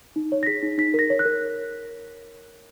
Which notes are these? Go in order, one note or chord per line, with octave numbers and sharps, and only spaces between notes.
D#4
C#5
A#6
G#4 B6
D#4
D#4 B6
A#4 A#6
C#5
F#6
A#4